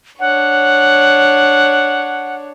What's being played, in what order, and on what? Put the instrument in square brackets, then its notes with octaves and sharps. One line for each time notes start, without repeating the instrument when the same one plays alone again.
[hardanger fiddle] D4 C#5 [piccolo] F#5